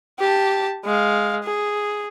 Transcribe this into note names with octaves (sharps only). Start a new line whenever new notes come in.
G4 A5
G#3 F5
G#4